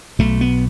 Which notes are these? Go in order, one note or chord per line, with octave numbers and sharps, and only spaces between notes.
B1 B2 A3
B3